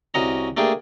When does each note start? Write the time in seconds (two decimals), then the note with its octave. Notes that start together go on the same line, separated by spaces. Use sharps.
0.14 C2 C#4 F#4 D#5 A#5
0.57 A3 A#3 D4 G4 G#4